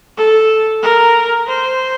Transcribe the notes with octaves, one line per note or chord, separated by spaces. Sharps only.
A4
A#4
C5